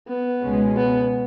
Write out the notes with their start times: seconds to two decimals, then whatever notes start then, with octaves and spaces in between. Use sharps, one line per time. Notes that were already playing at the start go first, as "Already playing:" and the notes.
0.08 B3
0.43 C#2 B2 G#3 C#4
0.77 B3